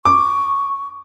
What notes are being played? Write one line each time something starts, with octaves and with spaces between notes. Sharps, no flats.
C#6 D6